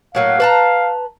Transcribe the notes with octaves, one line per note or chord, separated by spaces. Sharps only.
A2 F#3 A#3 F5
B4 A5 A#5